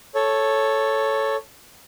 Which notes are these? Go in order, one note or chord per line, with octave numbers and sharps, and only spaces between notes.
A4 C#5